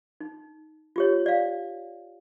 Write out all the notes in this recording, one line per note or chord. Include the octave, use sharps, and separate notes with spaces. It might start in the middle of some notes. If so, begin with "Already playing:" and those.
D#4
F4 G4 C#5
D5 F5